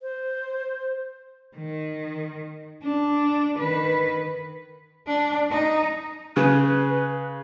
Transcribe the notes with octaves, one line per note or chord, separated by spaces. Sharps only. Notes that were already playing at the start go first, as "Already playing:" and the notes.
C5
D#3
D4
D#3 B4
D4
D#4
C#3 B4